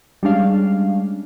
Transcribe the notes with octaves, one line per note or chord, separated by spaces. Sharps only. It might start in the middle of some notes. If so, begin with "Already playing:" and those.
G3 G#3 C#4 D4 F5